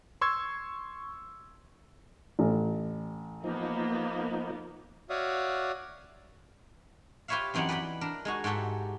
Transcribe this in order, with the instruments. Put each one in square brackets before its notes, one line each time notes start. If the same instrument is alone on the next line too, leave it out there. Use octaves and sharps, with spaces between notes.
[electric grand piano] C6 C#6 E6 G#6
[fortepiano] A1
[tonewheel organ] F3 D#4 [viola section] A#3 B3
[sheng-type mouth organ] F#4 C#5 D5 E5 F5 D#6
[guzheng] F4 G4 B4 C#5 E5 F5
F#2 E3 C4 D#4 D5 F#5
B4 D5 G5 B5
D4 A#4
G#3 D#4 F#4
G#2 F#4 G4 A4 E5